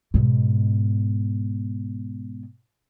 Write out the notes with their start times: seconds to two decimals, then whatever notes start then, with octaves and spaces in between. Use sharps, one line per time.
0.14 G#2 B2